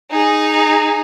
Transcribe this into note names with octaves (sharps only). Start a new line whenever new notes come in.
D#4 G#4